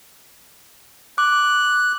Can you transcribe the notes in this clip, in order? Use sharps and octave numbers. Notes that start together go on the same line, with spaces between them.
D6 F#6